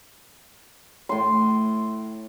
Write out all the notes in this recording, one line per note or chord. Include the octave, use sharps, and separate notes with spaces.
A2 C6